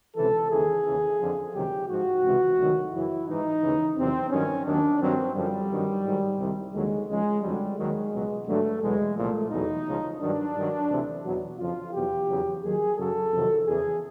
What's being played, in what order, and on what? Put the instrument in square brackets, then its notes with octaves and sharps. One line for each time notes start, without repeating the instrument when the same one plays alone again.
[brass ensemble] C#2 C3 E3 A4
D#2 C#3 E3 G#4
D#2 C#3 E3
F2 D3 F3
C#2 C3 D#3 F#3 G4
G#2 F3 F#4
C#2 C3 E3
D2 C3 D#3 F#3
F#2 C#3 E3 E4
G#2 E3 D#4
D#2 C#3 E3
E2 C3 D#3 F#3 C4
G2 D#3 F#3 C#4
D#2 D#3 F#3 D4
G2 D#3 F#3 C4
F#2 D3 F3 G3
G2 D#3 F#3
G#2 D#3 F#3
C2 C3 D#3
D#2 D3 F#3 G#3
C#2 C#3 F3 G#3
F2 D3 F#3 G3
D#2 D#3 F#3 G#3
C#2 B2 F#3
G2 D3 F#3 A3
E2 B2 F#3 G#3
C2 A#2 F3 A3
E2 B2 F#3 D#4
C#2 C#3 F3
G2 D#3 F#3 D4
G2 D#3 F#3
D2 C3 E3
E2 B2 F#3
F2 C#3 F3 F4
E2 B2 F#3 G4
E2 C#3 F#3
D#2 D#3 F#3 G#4
F#2 C#3 F#3 A4
F2 C3 D#3 F#3
E2 C#3 E3 G#4